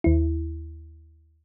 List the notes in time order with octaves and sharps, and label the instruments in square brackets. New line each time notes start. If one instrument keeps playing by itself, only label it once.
[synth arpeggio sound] D#2 E4